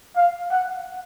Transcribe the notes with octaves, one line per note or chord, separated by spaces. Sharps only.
F5
F#5